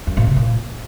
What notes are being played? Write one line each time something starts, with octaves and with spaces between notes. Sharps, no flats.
F#2
A#2
C3
A#2